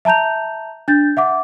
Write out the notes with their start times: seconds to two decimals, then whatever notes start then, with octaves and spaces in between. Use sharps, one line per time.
0.05 E5 A5 A#5 G6 F7
0.88 D4 G6 A6
1.17 E5 F#5 D6